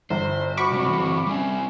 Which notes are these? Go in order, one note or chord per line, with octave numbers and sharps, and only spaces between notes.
G1 C5
F#4 B5 C#6 D6
C3 G#3 C4
E3 C4
G3 C4 C#4 E5